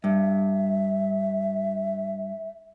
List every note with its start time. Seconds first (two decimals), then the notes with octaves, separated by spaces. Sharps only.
0.04 G2 E5